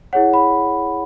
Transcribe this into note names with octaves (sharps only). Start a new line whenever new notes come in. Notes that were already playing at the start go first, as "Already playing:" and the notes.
E4 G#4 C#5 F#5
B5